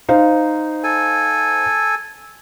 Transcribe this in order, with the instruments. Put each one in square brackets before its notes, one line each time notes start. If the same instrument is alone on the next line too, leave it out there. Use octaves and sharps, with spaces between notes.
[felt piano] D#4 C5 F5
[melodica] A4 G#5